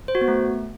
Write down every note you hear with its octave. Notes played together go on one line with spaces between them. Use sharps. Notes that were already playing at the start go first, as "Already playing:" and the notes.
C5
F#4
B3
A3